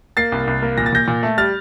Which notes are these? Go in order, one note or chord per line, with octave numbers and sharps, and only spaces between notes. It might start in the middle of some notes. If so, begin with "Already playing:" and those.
A#3 A6 C7
C2
C2
A#3
A#2 A#6
A6
A#2 G6 A#6
A#2
A3
G3 F6 A6